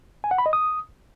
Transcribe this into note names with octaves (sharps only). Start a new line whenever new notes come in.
G#5
F#5
B5
D#5
D#6